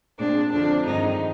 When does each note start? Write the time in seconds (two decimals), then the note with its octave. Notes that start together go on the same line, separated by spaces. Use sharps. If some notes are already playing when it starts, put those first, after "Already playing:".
0.19 A#2 G#3 C4 D4
0.52 F2 D3 F3 D4
0.86 G2 D#3 G#3 C4 D#4